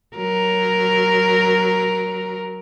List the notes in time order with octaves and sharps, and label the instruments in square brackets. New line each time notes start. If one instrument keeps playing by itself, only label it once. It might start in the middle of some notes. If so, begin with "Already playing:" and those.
[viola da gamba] F#3 A#4